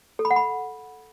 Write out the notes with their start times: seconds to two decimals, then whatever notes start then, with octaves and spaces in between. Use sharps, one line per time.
0.19 A4
0.25 B5
0.31 F#5
0.36 B5